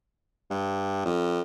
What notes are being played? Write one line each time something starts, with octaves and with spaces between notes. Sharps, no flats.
G2
F2